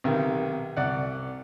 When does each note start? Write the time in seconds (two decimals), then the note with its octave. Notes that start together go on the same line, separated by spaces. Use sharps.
0.04 B1 C3 D#3
0.77 C2 D5 F#5